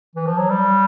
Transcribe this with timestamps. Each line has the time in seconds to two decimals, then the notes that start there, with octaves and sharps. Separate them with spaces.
0.15 E3
0.27 F3
0.38 F#3
0.50 G3